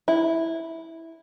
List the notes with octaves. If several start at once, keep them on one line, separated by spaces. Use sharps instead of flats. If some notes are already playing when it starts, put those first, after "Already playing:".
E4